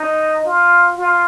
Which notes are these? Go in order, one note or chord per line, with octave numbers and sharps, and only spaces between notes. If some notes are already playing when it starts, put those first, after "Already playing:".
Already playing: D#4
F4
F4